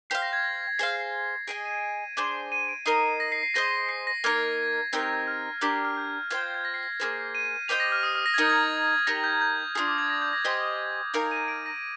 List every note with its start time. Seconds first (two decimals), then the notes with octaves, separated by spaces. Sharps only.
0.10 G4 C5 F5 C7
0.22 A#6
0.33 G#6
0.44 A#6
0.79 G#4 C5 F5 C7
1.48 G#4 D#5 G#5 D7
1.65 D#7
2.17 D4 G#4 C5
2.52 D#7
2.68 D7
2.86 D#4 A#4 D#5 C7
3.20 A#6
3.32 C7
3.43 C7
3.54 G#4 C5 D#5 A#6
3.89 C7
4.07 A#6
4.24 A#3 D#4 A#4 G#6
4.93 C4 D#4 G4 A#4
5.28 F6
5.61 D4 G4 A#4 F6
5.85 F6
5.97 G6
6.31 F4 C5 G5 G#6
6.43 G6
6.54 G#6
6.65 A#6
6.74 C7
6.83 A#6
7.00 A#3 D4 G#4 C5
7.35 D#7
7.68 G4 C5 D#5 G5 F7
7.80 A#6
7.92 F6
8.03 D#6
8.15 F6
8.26 A#6
8.34 G#6
8.38 D#4 A#4 D#5 G6
8.49 G#6
9.07 D#4 G4 A#4 A#6
9.24 G6
9.41 G6
9.75 D4 F4 G#4 D#6
9.88 D6
9.98 G#6
10.10 A#6
10.22 G6
10.33 A#6
10.45 G4 C5 D#5 G#5
11.14 D#4 A#4 F5 G#5 D7
11.31 D#7
11.48 D7
11.66 A#6